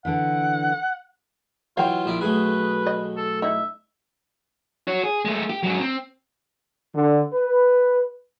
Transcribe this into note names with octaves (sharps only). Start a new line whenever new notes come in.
D3 E3 F#5
E3 F#3 F4 F5 G5
A#1 E4 D5
B1 A3 G#4 B4
D#5
A4
D#4 E4 E5
F#4 C#5
G#4
G#3 A3
G4
G#2 F#3
C4
D3
B4